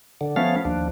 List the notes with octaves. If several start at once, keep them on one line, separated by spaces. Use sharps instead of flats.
D3
F3 A3 B3 C#4 F5
D#2 F3 D4